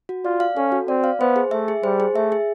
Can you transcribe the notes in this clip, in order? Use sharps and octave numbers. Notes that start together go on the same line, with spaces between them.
F#4
F4 D5
F5
C#4 A4
F#4
C4 D5
F5
B3 C5
G#4
A3 E5
G#4
G3 C5
G#4
A3 E5
G#4